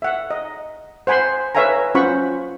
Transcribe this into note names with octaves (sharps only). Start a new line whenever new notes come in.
E5 F#5
D#5
C5 F#5 G#5 B5 C6
B4 C#5 E5 F5 G#5 A#5
C#4 F4 C5 F#5 B5 C#6